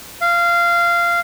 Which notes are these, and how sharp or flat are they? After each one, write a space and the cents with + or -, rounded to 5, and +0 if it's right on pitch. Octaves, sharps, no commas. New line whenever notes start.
F5 -15